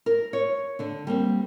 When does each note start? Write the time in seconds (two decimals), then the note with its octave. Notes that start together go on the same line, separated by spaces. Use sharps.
0.06 A#4
0.33 C#5
0.79 D3 D4
1.07 G3 A#3 C4